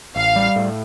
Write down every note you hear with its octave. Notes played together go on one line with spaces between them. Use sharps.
A1 F5
G3
A2